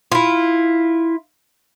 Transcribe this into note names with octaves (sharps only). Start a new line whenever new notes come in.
E4 F4